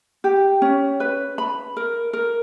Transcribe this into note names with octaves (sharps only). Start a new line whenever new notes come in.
G4
C#4
B4
B5
A#4
A#4